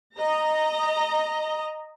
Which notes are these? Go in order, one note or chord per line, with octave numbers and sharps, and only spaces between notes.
D#5 A#5